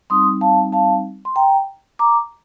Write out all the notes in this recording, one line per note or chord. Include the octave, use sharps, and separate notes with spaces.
G3 C4 D#4 C6 D#6
F5 A5
F5 A5
C6
G5 A#5
A#5 D6